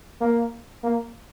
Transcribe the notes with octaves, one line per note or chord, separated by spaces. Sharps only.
A#3
A#3